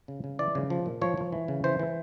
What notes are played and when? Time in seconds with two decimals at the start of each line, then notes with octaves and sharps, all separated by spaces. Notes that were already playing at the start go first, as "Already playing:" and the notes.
0.08 C#3
0.24 C#3
0.39 E3 D5
0.55 C#3
0.70 F3
0.86 A#2
1.01 F3 C#5
1.17 F3
1.32 E3
1.48 C#3
1.64 E3 C5
1.79 E3